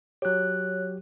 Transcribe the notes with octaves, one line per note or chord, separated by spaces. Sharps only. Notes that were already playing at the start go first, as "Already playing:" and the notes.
F#3 G4 C#5 F#6